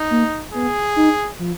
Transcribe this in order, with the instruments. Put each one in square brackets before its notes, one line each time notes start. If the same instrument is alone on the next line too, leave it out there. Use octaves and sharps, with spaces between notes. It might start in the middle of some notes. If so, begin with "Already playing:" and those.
Already playing: [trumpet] D#4
[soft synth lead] A#3
[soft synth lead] B3 [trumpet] G#4
[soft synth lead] D#4
F3